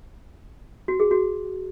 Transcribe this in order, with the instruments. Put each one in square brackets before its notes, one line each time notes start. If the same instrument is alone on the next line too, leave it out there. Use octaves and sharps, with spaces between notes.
[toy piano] F#4
G#4
F#4